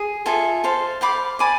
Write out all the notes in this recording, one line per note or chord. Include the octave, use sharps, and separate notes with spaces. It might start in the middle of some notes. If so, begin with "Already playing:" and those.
Already playing: G#4
F4 A4 E5 G#5
A4 C5 F5
C5 F5 B5 D6
D5 G#5 B5 D6